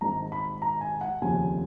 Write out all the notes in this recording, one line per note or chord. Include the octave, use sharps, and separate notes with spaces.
G#1 G#2 D#3 A#5
B5
A#5
G#5
F#5
F1 D#2 C#3 F3 G#5